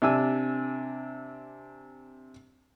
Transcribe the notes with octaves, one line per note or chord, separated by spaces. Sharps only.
C3 D4 G#5 E6